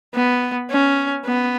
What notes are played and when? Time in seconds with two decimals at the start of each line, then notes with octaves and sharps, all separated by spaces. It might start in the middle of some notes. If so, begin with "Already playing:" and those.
0.15 B3
0.71 C#4
1.26 B3